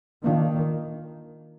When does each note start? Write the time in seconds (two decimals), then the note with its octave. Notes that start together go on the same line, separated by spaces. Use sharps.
0.24 D#3 A#3 D4 F4